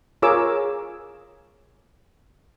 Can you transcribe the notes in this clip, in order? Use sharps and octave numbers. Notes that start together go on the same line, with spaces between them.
F4 G#4 A#4 C#5 D6 E6